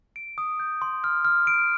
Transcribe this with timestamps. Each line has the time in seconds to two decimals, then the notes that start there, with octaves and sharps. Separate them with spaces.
0.16 D7
0.38 D#6
0.60 G6
0.82 C6
1.04 F6
1.25 F6
1.47 D7